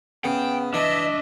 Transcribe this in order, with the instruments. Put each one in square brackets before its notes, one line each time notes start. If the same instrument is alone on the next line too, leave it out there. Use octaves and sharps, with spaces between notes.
[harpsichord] C#3 [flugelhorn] B3 [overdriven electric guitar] G5
[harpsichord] E3 [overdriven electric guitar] D4 [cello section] D#5 E5